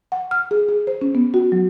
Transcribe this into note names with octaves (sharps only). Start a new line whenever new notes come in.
F#5
F6
G#4
G#4
C5
C#4
B3
F#4
F#3